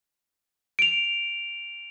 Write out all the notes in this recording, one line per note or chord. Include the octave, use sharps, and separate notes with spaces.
D7 F7